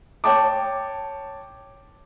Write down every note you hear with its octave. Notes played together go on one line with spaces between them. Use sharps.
C#5 G5 A5 D6